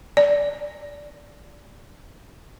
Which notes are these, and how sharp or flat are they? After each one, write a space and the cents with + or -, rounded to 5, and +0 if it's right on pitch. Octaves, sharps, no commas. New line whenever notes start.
D5 -20